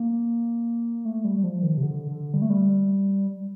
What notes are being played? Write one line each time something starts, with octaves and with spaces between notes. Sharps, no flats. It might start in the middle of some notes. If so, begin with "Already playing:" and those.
Already playing: A#3
A3
G3
G3
F3
D#3
C3
D3
D3
G3
A3
G3